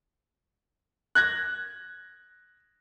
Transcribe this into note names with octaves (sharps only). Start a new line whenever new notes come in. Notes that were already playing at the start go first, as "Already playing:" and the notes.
F#6 G#6 A#6